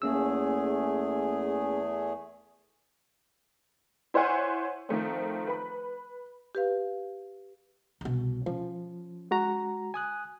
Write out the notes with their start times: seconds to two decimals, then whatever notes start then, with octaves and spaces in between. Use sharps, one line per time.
0.02 E2 A3 A#3 C#4 G#4 E6
4.14 E4 C5 C#5 F#5 G#5
4.89 D#3 F3 A3 C4
5.47 B4 B5
6.55 G4 B4 F5
8.01 C2 B2
8.46 F3 C#4
9.31 G#3 F#4 A#5
9.94 G#5 D#6 F#6